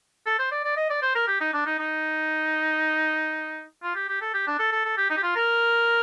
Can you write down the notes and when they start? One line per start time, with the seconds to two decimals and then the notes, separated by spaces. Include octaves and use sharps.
0.26 A4
0.39 C5
0.51 D5
0.64 D5
0.77 D#5
0.90 D5
1.02 C5
1.15 A#4
1.28 G4
1.41 D#4
1.53 D4
1.66 D#4
1.79 D#4
3.83 F4
3.95 G4
4.09 G4
4.21 A4
4.34 G4
4.47 D4
4.59 A4
4.72 A4
4.85 A4
4.97 G4
5.10 D#4
5.17 G4
5.23 F4
5.36 A#4